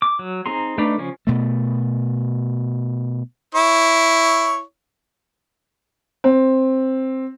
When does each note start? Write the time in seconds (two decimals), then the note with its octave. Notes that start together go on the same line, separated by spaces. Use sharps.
0.02 D6
0.19 F#3
0.46 C4 D#4 G#4 A#5 C6
0.78 A3 D4 D#4 B4 D5
0.98 C#3 F3 C#4
1.27 B2 A3
3.55 E4 C#5
6.24 C4